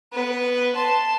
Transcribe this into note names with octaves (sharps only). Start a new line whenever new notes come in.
B3 B4
A5 C6